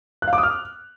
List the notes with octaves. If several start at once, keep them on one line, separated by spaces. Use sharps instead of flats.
F#6
F5
D6
D#6
F6